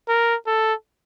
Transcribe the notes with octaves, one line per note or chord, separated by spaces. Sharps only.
A#4
A4